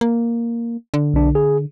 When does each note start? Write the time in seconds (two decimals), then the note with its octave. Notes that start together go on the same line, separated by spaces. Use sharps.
0.01 A#3
0.94 D3
1.14 B1 D4
1.35 G#4